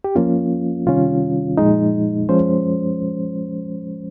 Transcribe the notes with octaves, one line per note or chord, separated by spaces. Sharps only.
G4
F3 A#3 C#4 F4
C3 D#3 G3 C#4 F4
A#2 F3 G#3 D#4
F3 G#3 C#4 C5